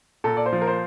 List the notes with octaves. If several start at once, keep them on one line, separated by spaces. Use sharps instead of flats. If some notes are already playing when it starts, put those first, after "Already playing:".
A#2 A4
D5
C5
F3
A#4
C5